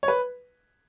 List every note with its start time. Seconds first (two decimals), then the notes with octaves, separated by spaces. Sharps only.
0.03 C#5
0.08 B4